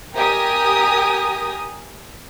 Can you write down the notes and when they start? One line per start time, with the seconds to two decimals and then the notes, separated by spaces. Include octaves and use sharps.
0.15 G4 A#4 G5 G#5 A#5 D#6